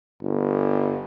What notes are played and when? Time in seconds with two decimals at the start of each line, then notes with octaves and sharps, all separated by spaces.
0.22 G1